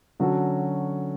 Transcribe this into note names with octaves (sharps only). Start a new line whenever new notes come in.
D3 F#3 C#4 F#4 A4